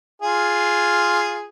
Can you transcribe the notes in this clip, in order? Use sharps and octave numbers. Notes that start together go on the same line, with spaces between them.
F4 G#4